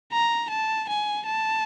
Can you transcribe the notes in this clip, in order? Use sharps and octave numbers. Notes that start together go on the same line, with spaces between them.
A#5
A5
G#5
A5